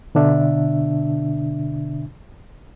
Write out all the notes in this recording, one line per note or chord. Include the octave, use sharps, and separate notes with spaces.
B2 D3 D4 E5